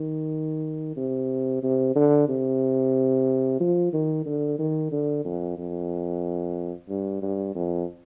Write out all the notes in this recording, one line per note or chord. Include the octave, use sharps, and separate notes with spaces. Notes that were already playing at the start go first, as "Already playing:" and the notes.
Already playing: D#3
C3
C3
D3
C3
F3
D#3
D3
D#3
D3
F2
F2
G2
G2
F2